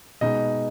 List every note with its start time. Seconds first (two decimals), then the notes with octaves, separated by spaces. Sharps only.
0.21 B2 G#3 B3 D#4 D#5